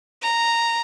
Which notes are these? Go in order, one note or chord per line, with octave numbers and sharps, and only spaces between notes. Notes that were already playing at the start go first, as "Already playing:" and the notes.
A#5